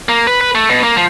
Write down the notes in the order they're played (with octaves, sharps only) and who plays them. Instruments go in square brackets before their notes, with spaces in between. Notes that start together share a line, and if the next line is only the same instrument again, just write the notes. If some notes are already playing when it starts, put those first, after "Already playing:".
[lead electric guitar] A#3
B4
B4
A3
B2
A#3
F3